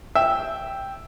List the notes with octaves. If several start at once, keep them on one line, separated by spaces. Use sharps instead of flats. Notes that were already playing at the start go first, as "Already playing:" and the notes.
E5 G5